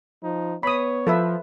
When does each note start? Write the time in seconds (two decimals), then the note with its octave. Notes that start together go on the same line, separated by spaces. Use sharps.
0.23 F3 D#4
0.63 B3 C#5 B5 D#6
1.07 F3 A4 B4 E5